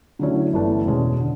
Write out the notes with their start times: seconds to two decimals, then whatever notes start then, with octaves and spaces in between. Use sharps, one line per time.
0.19 D3 F#3 A3 C#4 E4
0.53 G1 G2 E3 A3 D4
0.86 E2 B2 G#3 C#4
1.20 D3